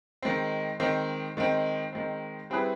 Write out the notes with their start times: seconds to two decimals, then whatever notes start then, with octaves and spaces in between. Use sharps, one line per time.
0.23 D#3 G#3 C4
0.80 D#3 G#3 C4
1.37 D#3 G#3 C4
1.93 D#3 G#3 C4
2.50 G3 C4 E4 G#4 B4